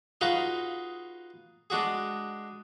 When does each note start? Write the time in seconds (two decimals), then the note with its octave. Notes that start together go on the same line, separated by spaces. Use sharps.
0.21 D#4 F4 F#4 G#4 B4
1.70 G#3 D4 F#4 G#4